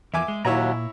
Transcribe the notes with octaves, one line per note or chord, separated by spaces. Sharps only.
E2 F3 E5 G#5 D6
G#3
D#2 A#2 F#3 E4 C#5 A#5